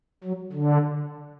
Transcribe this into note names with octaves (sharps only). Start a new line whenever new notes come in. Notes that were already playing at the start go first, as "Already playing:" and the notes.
F#3
D3